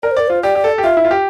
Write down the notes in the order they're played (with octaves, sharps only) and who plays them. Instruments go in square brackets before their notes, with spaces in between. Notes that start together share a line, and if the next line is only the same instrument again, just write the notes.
[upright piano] A#4 [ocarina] D5
[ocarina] C5
[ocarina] A#4 [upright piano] D5
[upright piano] F4 [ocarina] C5
[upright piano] G4 [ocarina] D5
[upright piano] G4
A4
G4
[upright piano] F4 [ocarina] E5
[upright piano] E4
F4
G4